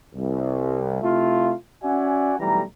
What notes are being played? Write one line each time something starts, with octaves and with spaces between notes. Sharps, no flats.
C2
C3 A3 E4 F4
C#4 F#4 D5 E5 F#5 G#5
B1 E3 G3 A3 A#5